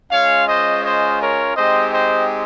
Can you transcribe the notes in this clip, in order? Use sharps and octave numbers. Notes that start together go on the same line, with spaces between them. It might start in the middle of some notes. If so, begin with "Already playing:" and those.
G#3 C#4 F4 C#5 F5
C5 D#5
C5 D#5
A#4 C#5
G#3 C4 D#4 G4 C5 D#5
C5 D#5